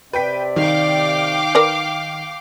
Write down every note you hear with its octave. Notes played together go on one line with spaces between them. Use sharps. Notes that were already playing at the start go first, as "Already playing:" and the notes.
C3 B4 D5 G5 B6
D#3 F5 G5 D6
A#4 B4 D5